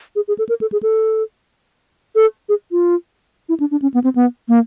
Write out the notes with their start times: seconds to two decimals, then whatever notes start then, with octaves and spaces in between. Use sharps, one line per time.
0.16 G#4
0.28 G#4
0.39 A4
0.49 A#4
0.61 A4
0.72 G#4
0.83 A4
2.15 A4
2.49 G#4
2.72 F4
3.49 E4
3.60 D4
3.71 D4
3.82 C#4
3.94 B3
4.04 C4
4.16 B3
4.49 A#3